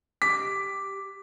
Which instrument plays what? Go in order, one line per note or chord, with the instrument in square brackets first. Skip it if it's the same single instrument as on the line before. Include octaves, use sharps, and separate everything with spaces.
[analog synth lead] G4 [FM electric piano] D6 [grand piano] B6